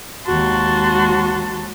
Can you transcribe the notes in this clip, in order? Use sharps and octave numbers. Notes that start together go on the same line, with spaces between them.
D#2 G#3 F#4 A5 C6